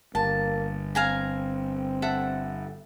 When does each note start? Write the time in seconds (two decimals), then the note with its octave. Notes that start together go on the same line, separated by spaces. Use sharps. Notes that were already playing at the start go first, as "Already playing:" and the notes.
0.15 G1 A#3 A5
0.95 C4 F5 G#5 A#5
2.02 A4 E5 F#5